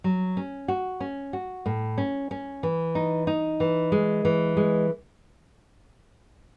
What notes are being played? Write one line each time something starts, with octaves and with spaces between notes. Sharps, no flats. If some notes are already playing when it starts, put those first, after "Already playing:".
F#3
C#4
F#4
C#4
F#4
A2
C#4
C#4
E3
D#4
D#4
E3
G#3
E3
G#3